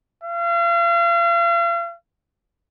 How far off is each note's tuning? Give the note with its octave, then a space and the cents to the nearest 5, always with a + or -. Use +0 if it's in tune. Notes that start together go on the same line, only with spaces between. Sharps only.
F5 -40